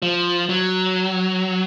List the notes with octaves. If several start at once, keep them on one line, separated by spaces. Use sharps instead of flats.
F3
F#3